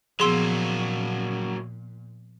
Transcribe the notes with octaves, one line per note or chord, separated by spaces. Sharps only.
A#2 F3 F#3 A#3 B3 G#4 C6 E6